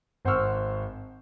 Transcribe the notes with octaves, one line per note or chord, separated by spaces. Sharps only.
G#1 C5 F#5 C#6 E6 F6